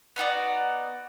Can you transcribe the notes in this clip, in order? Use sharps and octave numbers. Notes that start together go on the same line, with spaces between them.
B3 D#4 F#4 D5